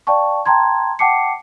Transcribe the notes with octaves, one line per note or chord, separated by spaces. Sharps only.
D5 F5 G5 A5 C#6
G5 A5 A#5 C6 G#6
F#5 G5 A5 D6 C7 C#7